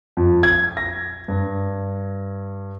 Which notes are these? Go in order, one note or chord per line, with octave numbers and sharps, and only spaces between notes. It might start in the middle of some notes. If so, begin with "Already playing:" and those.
F2
G#6
A#6
G2